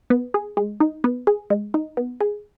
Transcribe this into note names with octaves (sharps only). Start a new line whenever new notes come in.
B3
G#4
G#3
D#4
B3
G#4
G#3
D#4
B3
G#4